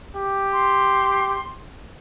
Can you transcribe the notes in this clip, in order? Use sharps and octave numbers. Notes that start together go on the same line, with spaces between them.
G4
C6